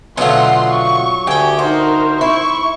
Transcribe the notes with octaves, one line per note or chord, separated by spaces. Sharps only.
B2 D3 F#3 A3 F4 F#5 C6
C#6
D2 G4 G5 G#5
D#4 F#4 A#4 C5
E4 C#6